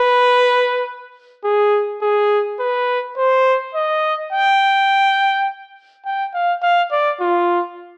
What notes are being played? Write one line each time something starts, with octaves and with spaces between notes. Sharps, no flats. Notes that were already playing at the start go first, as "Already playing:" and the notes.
Already playing: B4
G#4
G#4
B4
C5
D#5
G5
G5
F5
F5
D5
F4